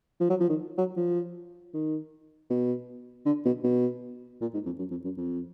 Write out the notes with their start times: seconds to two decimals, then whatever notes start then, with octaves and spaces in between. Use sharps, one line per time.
0.21 F3
0.30 F#3
0.40 F3
0.49 D#3
0.78 F#3
0.97 F3
1.74 D#3
2.50 B2
3.26 D3
3.45 B2
3.64 B2
4.41 A#2
4.54 G#2
4.66 F2
4.79 F#2
4.91 F2
5.04 F#2
5.17 F2